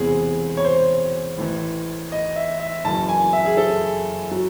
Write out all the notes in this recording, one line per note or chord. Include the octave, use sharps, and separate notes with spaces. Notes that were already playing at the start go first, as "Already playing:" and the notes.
Already playing: E1 E2 C3 G#4
C#5
C5
A1 A2 E3
D#5
E5
E5
F#1 F#2 E3 A5
G#5
E5
G#4
A4
F#3